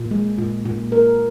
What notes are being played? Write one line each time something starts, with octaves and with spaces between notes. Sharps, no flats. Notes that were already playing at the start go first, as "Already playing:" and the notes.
Already playing: A#2
G#3
A#2
A#2
A#4